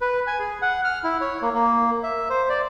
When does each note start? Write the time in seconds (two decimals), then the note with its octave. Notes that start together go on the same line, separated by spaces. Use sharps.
0.01 B4
0.27 G#5
0.39 G#4
0.62 F#5
0.84 F6
1.04 E4
1.21 C#5
1.42 A#3
1.54 A#3
2.03 E5
2.30 C5
2.49 D5